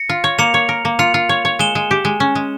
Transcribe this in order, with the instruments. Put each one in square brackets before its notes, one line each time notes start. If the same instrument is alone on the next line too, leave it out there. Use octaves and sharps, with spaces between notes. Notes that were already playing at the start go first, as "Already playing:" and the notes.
Already playing: [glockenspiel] A#6 C#7
[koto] F4
C#5
[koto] A#3 [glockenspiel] C#7 F7
[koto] C#5
A#4
A#3
[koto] F4 [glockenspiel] C#7 F7
[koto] F4
C#5
C#5
[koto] G#3 [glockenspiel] E7 G7
[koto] G#3
G4
G#3
C#4
G#3